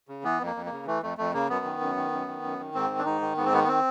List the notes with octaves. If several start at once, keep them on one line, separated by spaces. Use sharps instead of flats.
C#3
E3 B3
F2 A#3
F2
A#3
C#3
E3 A3
F2 A3
F2 A3
C#3 A#3
F#2 B3
D#3
F#2
D#3
F#2
D#3
F#2
D#3
G#2 C4
D#3
D4
G#2 D#4
D#3
G#2 B3
C4
D#3 B3
B3
C4